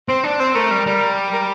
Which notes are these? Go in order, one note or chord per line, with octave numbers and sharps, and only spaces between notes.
C4 C5
D4
C4 C5
A3 A#4
G3
G3
A#4